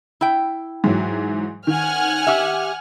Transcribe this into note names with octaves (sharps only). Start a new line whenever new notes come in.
E4 G5
G#2 E3 F#3
D#3 F#5 G#5 F6
G4 E5